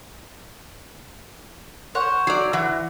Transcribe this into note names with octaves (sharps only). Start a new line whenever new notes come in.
C5 C#5 F#5
F#3 D5
E3 F#4